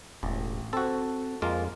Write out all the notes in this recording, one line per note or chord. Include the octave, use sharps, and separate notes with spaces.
E1 A1
C4 F#4 A4
F2 G#3 A#3 F4